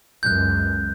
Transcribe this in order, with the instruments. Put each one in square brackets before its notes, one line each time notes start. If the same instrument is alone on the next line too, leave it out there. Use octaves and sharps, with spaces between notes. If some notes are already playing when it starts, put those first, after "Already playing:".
[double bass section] C#2 F#2 [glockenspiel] F#6 G6